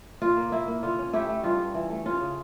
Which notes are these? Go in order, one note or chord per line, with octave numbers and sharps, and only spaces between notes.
A#2 F4
A#3
A#3 E4
A#3
D3 F4
C#4
A3 E4 G4
A3
G2 F4
G2
E3
A3
C#4 F4
C#3